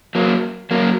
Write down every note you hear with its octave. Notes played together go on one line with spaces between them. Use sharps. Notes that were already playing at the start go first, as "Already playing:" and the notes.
F#3 A#3
F#3 A#3